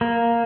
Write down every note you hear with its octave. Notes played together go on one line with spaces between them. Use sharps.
A#3